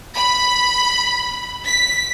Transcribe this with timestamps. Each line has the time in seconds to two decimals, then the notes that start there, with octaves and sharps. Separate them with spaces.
0.16 B5
1.65 B6